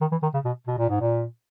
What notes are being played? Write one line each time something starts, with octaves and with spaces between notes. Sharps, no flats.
D#3
E3
D#3
C#3
B2
B2
A#2
G#2
A#2